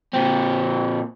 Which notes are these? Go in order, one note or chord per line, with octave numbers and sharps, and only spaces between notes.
A#2 C4